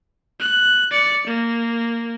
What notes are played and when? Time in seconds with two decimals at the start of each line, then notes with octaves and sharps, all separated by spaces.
0.40 F#6
0.91 D5 C#7
1.27 A#3